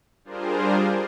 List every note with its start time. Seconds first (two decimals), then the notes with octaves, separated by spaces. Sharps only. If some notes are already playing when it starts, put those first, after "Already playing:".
0.24 G3 D4 F4 G#4 A#4 C5